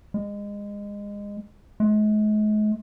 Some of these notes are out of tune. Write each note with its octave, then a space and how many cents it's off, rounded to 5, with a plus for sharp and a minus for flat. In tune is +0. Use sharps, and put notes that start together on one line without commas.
G#3 -25
G#3 +40